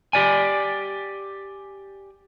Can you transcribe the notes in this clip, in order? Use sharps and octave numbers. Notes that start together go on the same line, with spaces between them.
G4 D5 G#5